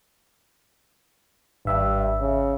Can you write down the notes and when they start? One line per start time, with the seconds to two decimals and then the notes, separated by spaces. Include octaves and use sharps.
1.65 G#1 G2 E5
2.20 C#3